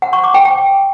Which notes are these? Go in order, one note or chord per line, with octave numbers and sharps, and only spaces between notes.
F#5
C#6
D6
G5
G5